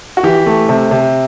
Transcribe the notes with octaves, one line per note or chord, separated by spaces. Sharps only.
F#4
E3 G4
A3
C3
C3